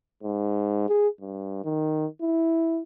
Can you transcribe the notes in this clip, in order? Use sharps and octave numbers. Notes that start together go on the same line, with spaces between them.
G#2
G#4
G2
D#3
E4